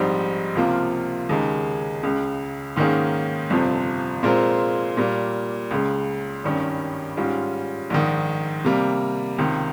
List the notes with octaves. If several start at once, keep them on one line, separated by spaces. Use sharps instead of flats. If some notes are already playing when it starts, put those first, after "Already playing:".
Already playing: A#1 G#2 G3 C4 D#4
C#2 C3 F3 A#3 F4
D#2 C#3 G#3 D#4 A#4
C#2 C#3 G#3
G#2 D#3 A#3 C#4 G#4
G1 F2 C3 F3
A#2 G#3 C4 F4 A#4
A#2 G3 A#3
C#2 C#3 G#3
G#1 G2 D#3 G3 C#4
G#2 G3 C#4 F4
A#1 G#2 D#3
C3 G3 A#3
C#2 C3 D#3